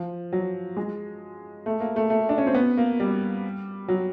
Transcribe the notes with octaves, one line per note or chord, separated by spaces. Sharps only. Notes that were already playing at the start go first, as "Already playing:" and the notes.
Already playing: F3
F#3
G#3
A3
A#3
A3
A3
D4
C#4
C4
B3
A#3
G3
F#3